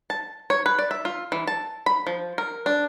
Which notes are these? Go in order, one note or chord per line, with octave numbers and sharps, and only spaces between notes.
A5
C#5
B4
D5
E5
F4
E3
A5
B5
F3
A#4
D4